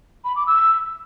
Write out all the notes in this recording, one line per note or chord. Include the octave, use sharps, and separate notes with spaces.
B5
D6
E6